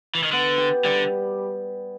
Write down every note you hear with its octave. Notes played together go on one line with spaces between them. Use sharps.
E3
D#3
D3 B3
G4
D3 G3